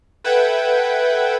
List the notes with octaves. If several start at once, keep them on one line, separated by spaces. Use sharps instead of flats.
A4 B4 E5 F#5 G5 G#6